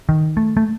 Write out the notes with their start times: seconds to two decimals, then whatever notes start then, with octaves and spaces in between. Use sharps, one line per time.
0.09 D#3
0.37 A3
0.57 A3